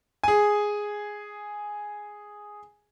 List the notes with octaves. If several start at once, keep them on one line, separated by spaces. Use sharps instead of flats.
G#4 G#5